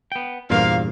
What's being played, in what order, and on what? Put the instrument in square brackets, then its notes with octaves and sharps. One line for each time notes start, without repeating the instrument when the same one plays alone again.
[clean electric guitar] B3 G5
[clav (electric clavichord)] E2 G2 A#2 [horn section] A#3 F5 [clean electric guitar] F4 C5